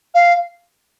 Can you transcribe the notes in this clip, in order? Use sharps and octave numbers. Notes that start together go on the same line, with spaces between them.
F5